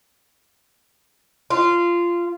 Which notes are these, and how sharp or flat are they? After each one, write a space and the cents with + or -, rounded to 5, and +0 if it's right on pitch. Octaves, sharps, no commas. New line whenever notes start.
F4 -15